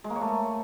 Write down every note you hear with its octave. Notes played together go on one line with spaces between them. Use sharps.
G#3
A#3
C#5
A3